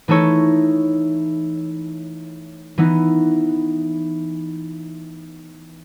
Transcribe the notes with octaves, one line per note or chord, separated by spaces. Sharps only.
E3 A3 D#4 A4 C#5
E3 B3 D#4